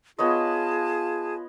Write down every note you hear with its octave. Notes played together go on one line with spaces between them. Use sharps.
B3 F4 G#4 C#5 D#5 A5